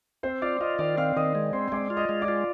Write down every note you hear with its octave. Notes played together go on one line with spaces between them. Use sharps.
C4 C5 C6
F4 D5 D6
F4 D#5 D#6
D#3 D5 D6
C4 F5 F6
D#3 D#5 D#6
G#3
C4 C5 C6
C6
G#3 D5 D6
F4
D#5 D#6
G#3
D5 D6
F4